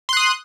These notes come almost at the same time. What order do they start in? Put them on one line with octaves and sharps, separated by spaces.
C6 F#6 D#6